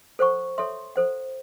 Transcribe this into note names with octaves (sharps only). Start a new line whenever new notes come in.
A4 C5 F#5 C#6
A4 C#5 E5 C6
A4 C5 F#5